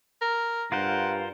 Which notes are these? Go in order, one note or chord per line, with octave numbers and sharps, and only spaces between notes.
A#4
G2 F4 A#4 C5 F#5